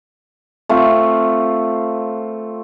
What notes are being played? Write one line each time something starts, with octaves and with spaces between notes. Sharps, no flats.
A3 C4 F4